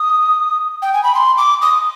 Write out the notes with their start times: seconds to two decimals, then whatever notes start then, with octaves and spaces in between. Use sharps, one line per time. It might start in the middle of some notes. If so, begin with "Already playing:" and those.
Already playing: D#6
0.82 G5
0.93 G#5
1.03 B5
1.15 C6
1.38 D6
1.62 D#6